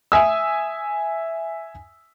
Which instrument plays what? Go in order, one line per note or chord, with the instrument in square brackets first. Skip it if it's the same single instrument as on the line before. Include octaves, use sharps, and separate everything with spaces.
[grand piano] E5 G#5 D#6 E6